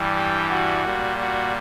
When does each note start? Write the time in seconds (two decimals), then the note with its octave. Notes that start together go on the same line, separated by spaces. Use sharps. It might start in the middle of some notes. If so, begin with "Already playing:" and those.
Already playing: G2 E3 G3
0.15 G4
0.50 F#4
0.84 A#2 G3
1.20 F#4